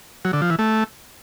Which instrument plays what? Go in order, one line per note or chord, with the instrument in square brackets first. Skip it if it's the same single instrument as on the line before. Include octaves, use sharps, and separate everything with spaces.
[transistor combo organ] F#3
D3
F3
E3
A3